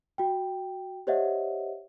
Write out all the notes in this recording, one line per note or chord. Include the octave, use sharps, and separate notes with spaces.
F#4 G5
G4 C5 C#5 D#5 E5 F#5